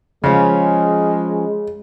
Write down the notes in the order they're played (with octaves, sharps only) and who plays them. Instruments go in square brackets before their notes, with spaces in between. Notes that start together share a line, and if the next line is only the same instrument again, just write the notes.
[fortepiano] C#3 [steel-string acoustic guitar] F3 C#4 [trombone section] G#3